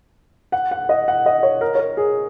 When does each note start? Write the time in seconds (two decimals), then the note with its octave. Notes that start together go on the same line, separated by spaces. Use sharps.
0.52 F#5
0.71 F#5
0.89 D#5
1.08 F#5
1.26 D#5
1.43 C#5
1.61 A#4
1.75 C#5
1.79 A#4
1.97 G#4